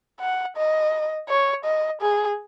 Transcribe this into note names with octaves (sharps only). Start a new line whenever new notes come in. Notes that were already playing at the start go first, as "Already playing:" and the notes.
F#5
D#5
C#5
D#5
G#4